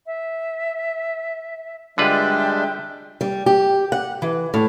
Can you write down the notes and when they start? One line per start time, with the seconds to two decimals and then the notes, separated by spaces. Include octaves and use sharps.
0.05 E5
1.98 D3 G3 G#3 D4 F4 B4 E5 G5
3.21 G3
3.46 G4
3.92 F#5
4.22 E3
4.54 A2